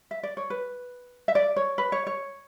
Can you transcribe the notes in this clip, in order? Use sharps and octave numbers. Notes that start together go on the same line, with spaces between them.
E5
D5
C#5
B4
E5
D5
C#5
B4
C#5
C#5